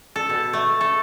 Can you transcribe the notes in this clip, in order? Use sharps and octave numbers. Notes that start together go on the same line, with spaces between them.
A4
B2
A3
A4